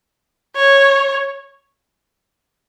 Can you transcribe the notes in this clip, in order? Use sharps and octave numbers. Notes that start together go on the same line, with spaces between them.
C#5